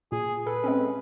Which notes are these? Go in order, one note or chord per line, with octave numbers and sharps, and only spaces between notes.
A#2 G#4
A4 B4
G#3 C4 C#4